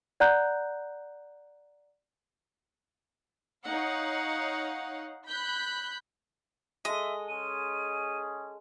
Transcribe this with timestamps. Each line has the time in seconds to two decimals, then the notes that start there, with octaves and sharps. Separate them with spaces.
0.20 D5 F#5 A#5 F#6 G6
3.64 D#4 C#5 F5 F#5
5.28 B5 F#6 G6 B6
6.85 G#3 A4 D#5 E5
7.29 C#4 G#4 D#7